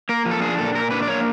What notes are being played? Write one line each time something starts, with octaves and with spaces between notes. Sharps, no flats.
A#3 A#4
F3
A4
D4 G#4
A#2 A4
A#2 A#4
D4 B4
D5
A#3 C#5